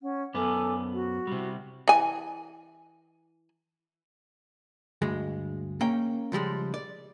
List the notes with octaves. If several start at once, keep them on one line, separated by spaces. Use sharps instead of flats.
C#4 F#5
F#2 B3 A4 G#5 D6
F#4
C3 G3
E3 G#5
D2 G2 G#3
A#3 C#4 G5
C#2 F3 G3 G#3
D5